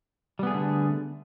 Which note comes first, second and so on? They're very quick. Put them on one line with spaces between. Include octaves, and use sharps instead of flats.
G3 B3 G#4 A3 D3